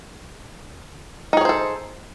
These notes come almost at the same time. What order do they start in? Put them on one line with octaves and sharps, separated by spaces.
D#4 G#4 C#5 C5 A4